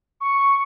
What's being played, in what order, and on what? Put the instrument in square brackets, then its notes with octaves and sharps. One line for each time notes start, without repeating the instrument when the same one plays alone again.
[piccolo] C#6